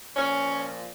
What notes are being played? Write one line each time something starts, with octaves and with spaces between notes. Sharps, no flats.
A#2 F3 C#4